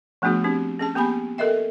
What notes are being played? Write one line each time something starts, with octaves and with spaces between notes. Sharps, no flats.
F3 A3 B3 D4 F#4 G#4
C4 D4 G4
C#4 G#4 A5
A#3 B3 G4 G#5 B5
A4 A#4 D#5 E5 G5